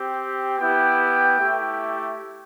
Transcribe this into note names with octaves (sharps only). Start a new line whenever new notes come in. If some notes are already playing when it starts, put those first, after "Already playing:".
Already playing: C4 G4
B3 E4 G4 G5
A3 E4 G4